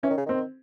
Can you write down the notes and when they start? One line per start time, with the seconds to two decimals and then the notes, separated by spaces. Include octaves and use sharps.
0.03 E3 C#4
0.10 D#3
0.17 C#3
0.26 D#3 C4